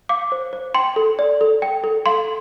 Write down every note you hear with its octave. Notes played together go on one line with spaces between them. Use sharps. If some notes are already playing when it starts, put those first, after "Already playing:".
F5 D6
C5
C5
G5 C6
A4
D5
A4
G5
A4
F5 C6